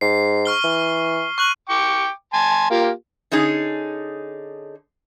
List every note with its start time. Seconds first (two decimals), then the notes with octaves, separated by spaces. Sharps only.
0.01 G#2 C7
0.45 C#6 F6 G7
0.64 E3
1.38 C#6 F#6 F#7
1.69 G5 C#6 D6
2.33 G#5 A5 C6
2.70 A#3 F4 G4
3.32 D3 C#4 D#4 G#4